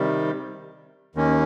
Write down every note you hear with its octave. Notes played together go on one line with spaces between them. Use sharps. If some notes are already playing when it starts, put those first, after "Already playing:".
Already playing: C3 D#3 G3
D#2 D#3 A#3 C#4